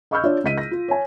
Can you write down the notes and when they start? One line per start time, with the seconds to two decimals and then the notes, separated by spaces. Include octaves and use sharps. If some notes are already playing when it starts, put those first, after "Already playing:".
0.11 D#5 B5 C#6 E6 F6 G6
0.23 D4 F4 C#5 D5
0.44 C#2 D#5 B6 D#7
0.58 A#6
0.71 F4
0.88 C#5 G#5